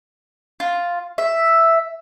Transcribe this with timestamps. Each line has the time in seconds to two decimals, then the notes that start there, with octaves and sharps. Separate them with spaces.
0.60 F4
1.18 E5